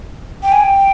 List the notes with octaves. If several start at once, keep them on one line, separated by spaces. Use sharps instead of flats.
G5
G#5
G5